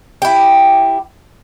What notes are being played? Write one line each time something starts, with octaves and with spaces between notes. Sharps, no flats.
E4 G4